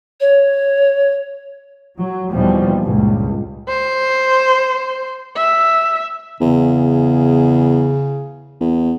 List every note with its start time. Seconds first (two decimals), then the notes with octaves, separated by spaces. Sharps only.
0.21 C#5
1.98 F#3
2.31 D#2 B2 E3 F3 G3
2.82 C#2 G2 A#2
3.69 C5
5.37 E5
6.41 E2 C#3
8.61 E2